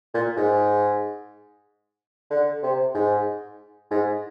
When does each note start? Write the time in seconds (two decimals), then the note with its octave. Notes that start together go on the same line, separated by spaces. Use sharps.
0.14 A#2
0.37 G#2
2.30 D3
2.63 C3
2.94 G#2
3.91 G#2